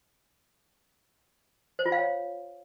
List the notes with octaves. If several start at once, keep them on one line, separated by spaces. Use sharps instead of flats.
C5
F4
F5
C#5